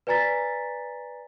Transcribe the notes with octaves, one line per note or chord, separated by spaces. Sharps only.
B4 D5 G#5 A#5 A6 B6